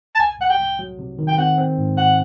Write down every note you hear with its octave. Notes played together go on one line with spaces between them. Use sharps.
A5
C2 G#5
C2 F#5
G5
C2
F#3
C3
D#3
G5
C4 F#5
C4
G#2
C4 F#5